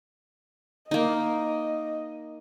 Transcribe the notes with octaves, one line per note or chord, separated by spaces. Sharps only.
A#3 D#4 D#5